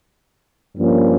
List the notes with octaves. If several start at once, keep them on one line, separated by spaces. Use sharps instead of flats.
G2 F3 A#3 C#4